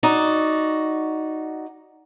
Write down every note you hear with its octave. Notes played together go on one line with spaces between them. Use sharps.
D#4 F#4 D5